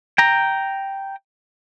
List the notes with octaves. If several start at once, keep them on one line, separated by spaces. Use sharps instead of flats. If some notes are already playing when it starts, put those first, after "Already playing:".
G5 A#5